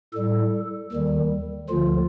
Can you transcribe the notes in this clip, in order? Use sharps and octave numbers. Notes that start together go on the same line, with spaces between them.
A2 G3 A4
D#2 D#3 G3
D2 D3 F3 F4